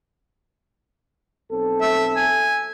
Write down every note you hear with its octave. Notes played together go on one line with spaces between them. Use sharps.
B1 C4 A4
E5
G#5